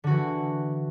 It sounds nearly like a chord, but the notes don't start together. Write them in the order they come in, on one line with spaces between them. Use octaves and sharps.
D3 F#4 E3